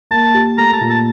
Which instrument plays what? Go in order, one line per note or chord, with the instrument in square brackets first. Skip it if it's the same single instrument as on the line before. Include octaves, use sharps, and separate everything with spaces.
[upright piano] A#3 [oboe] A5
[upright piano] G4
[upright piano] A3 [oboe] A#5
[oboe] A5
[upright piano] A#2
[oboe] A5